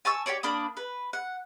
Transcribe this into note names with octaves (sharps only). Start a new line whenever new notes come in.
G#5 A5 C#6 E6
G4 A#4 C#5 D5
A#3 D4 B5 D#6
B4
F#5